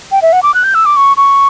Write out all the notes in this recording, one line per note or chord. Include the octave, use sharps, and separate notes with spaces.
G5
E5
F#5
D6
F#6
G6
E6
D6
C#6
C#6